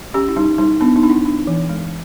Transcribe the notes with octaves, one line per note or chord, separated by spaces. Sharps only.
C#4 G4
E4
G3 D#4
G3 D#4
B3 D4
D#4
D4
E4
D4
E3
G#3